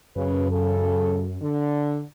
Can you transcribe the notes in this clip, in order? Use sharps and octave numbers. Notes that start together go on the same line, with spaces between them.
F#2 C#3 B4
C#3 A4
D3